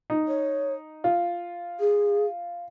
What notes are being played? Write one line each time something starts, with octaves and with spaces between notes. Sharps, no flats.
D#4
C#5
F4
G#4